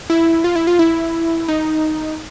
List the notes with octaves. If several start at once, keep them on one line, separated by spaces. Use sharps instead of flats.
E4
F4
E4
F4
E4
D#4